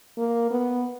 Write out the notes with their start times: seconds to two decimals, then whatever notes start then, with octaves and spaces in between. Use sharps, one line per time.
0.18 A#3
0.51 B3